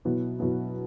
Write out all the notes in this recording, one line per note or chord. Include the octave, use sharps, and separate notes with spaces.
B2 F#3 B3 E4
B2 F#3 B3 E4